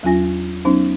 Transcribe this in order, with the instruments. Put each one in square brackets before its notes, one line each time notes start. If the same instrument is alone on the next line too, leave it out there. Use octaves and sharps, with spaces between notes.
[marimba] E2 F#3 C#4 F4 G#5 A#6
F#3 B3 C#4 D#4 C5